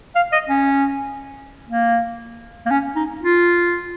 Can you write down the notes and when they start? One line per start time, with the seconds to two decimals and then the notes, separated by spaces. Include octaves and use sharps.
0.16 F5
0.32 D#5
0.49 C#4
1.69 A#3
2.66 A#3
2.70 C#4
2.96 D#4
3.22 F4